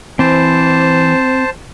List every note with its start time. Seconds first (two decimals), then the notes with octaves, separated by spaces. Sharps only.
0.19 E3 C4 C5 A5